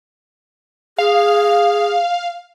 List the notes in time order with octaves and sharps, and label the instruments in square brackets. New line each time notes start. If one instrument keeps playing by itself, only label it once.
[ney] G#4 [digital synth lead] F5